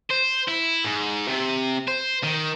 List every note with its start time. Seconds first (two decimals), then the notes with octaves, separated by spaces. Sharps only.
0.10 C5
0.48 E4
0.85 G#2
1.28 C3
1.88 C5
2.23 D#3